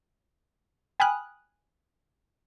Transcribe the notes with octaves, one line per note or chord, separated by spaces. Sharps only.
G5 G#5 B5 D#6 F6 F#6